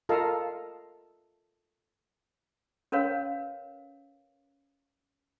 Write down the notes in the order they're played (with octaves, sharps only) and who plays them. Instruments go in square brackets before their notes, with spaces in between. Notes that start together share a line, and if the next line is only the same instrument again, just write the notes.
[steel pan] F4 A4 A#4 D#5 F5
[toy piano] C#4 A#4 B4 C#5 F5